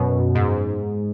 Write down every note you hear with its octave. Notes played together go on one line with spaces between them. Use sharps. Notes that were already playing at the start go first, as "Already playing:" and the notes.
Already playing: F#2 B2
G#2